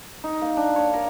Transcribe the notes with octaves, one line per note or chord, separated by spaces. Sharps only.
D#4
A#3
D4
C#5
A#4